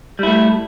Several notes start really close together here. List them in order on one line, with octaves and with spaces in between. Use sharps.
G3 E4 A3